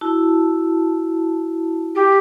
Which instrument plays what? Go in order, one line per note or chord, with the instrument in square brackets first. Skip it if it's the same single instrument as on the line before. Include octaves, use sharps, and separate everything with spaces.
[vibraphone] E4 F#4 A5
[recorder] G4